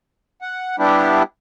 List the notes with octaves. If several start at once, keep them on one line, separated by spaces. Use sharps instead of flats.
F#5
G3 B3 D4 E4 G4